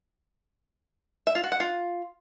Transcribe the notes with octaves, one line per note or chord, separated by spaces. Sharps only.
E5
F4
F#4
F#5
F4